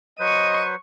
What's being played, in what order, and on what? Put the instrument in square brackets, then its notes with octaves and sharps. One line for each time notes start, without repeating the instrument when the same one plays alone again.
[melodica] F#3 B4 C5 [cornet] D#5 [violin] C#6 D#7